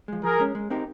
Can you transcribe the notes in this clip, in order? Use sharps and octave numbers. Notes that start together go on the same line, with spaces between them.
F3 G#3
F3 G#4 A#4
G#3 C#4
G#3
C4 D#4 G4 A#4